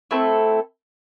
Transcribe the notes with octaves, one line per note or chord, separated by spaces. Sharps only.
A3 C4 E4 A4